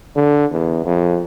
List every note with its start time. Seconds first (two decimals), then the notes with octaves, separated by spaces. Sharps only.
0.15 D3
0.52 E2
0.84 F2